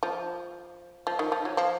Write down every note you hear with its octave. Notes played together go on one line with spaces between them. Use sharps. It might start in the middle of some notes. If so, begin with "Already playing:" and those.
F3
F3
D#3
F3
F#3
F3